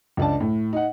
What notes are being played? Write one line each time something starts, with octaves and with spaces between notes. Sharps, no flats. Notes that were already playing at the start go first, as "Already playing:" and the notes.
C#2 D4 A5
A2
D#4 F#5